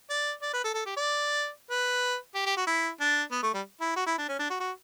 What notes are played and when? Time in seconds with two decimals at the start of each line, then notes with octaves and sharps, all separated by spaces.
0.10 D5
0.42 D5
0.53 B4
0.64 A4
0.74 A4
0.86 G4
0.96 D5
1.70 B4
2.35 G4
2.46 G4
2.57 F#4
2.67 E4
3.00 D4
3.31 B3
3.43 A3
3.54 G3
3.81 E4
3.96 F#4
4.06 E4
4.18 D4
4.28 C#4
4.39 D4
4.50 F#4
4.60 F#4